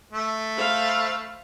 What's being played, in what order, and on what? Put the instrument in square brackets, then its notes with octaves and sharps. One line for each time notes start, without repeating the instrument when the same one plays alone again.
[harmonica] A3
[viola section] C5 F5 B5